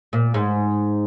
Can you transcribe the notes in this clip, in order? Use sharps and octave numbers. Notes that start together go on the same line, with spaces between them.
A#2
G#2